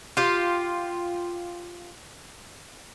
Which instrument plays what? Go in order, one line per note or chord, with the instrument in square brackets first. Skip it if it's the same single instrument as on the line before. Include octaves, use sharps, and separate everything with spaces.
[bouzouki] F4 G4